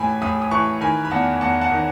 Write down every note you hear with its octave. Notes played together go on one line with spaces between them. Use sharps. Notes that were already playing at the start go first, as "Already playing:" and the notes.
Already playing: A2 E3 G#5 B5
A2 B5 D#6
D#6
E3 A5 C#6
D#3 G#5 B5
B5
E2 F#5 A5
E2 F#5 A5
F#5 A5
D#3